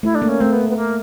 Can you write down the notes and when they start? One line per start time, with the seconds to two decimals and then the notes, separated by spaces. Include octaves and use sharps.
0.03 A3 E4
0.15 D4
0.22 A#3
0.28 C#4
0.40 A3 C4
0.53 B3
0.69 B3
0.76 A#3